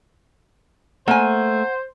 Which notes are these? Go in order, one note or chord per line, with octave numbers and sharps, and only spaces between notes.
A3 A#3 C5 F#5 G#5